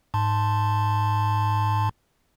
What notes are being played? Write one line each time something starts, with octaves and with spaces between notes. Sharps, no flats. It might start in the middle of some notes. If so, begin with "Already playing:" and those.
G#2 A5 C6